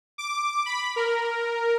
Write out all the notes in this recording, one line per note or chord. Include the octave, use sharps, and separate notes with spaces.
D6
B5
A#4